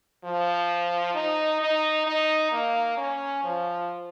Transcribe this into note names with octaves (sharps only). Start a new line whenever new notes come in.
F3
D#4
D#4
D#4
A#3
C#4
F3